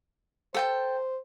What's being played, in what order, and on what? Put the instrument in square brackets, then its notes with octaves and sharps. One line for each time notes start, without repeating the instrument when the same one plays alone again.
[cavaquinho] A4 G5 A5 [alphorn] C5